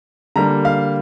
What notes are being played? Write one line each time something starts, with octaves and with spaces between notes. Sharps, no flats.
D3 G3 A#3 A#5
F5